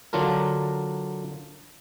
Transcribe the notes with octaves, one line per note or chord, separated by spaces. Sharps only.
D3 F#3 D4 F4 A#4